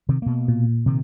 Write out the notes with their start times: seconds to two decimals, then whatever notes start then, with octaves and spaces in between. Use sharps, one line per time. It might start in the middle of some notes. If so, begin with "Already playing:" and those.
0.09 C3 D#3
0.22 B2 A#3
0.48 A#2
0.86 C3 D#3